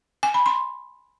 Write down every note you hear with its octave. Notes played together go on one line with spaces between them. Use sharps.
G#5
B5
C6